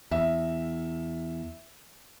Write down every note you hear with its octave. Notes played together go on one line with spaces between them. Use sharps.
E2 E5